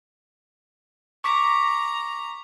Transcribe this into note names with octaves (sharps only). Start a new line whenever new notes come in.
A#5 C#6 D6 B6